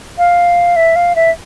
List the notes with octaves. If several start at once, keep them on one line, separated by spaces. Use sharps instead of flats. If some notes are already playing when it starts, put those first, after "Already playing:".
F5
E5
F5
E5